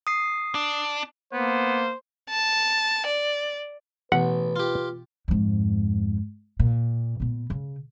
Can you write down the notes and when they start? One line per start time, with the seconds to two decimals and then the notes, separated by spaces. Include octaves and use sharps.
0.07 D#6 C7
0.55 D4
1.33 A#3 B3 C5
2.29 A5
3.07 D5
4.12 A1 B2 E3 B3 B4 F#5
4.56 F4 G4
5.28 F2 G#2
6.59 A#2
7.20 A#2 B3
7.50 C#3